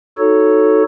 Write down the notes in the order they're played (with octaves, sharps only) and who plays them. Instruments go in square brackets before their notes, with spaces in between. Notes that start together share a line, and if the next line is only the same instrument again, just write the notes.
[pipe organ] D#4 F#4 A4 C#5